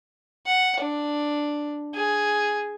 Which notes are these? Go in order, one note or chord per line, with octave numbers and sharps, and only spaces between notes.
F#5
D4
G#4